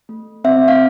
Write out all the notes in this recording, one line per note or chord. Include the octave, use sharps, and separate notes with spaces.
A3
C4 E5
F5